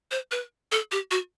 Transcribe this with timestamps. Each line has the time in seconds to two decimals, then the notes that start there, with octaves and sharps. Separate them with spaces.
0.11 C5
0.31 B4
0.72 A4
0.92 G4
1.11 F#4